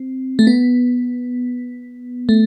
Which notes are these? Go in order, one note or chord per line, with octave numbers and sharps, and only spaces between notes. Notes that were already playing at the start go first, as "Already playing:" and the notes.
Already playing: C4
A3
B3
A3